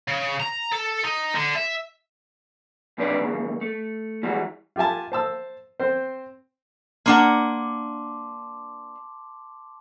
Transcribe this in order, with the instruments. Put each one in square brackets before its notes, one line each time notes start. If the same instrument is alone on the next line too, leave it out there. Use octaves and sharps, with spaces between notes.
[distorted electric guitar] C#3
A#5
A4
D#4
D3
E5
[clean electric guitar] B1 C3 D4 D#4 B4 D5
D#2 G#2 C#3
A3
E3 G3 G#3 F#4
[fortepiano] F4 G4 E5 G#5 A5
C5 A5 E6
C4 C5
[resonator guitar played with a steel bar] A#3 D4 F#5 [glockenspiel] A5 C6 D6